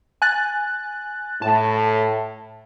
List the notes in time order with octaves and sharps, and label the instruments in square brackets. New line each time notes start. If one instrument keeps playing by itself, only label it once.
[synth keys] G#5 F#6 A6
[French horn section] A2 [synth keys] A5